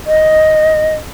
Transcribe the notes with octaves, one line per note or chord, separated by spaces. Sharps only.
D#5